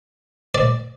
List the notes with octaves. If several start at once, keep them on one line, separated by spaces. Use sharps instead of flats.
D5